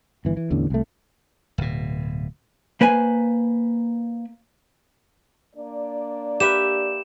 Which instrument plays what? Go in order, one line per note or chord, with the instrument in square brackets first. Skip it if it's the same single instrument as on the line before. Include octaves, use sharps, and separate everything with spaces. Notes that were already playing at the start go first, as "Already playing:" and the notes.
[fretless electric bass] G1 E3
E3
A1 E2 D3
C2 A3
[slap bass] D1 B2
[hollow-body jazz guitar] A#3 B4 C5 G#5
[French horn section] A#3 D4 D5
[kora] G4 B4 E5 [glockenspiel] E7